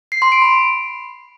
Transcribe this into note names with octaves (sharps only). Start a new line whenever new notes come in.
C7
C6
D7
B5